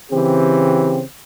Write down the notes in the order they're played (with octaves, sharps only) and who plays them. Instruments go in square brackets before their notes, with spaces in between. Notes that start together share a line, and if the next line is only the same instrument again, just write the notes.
[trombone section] C#3 E3 C4 G4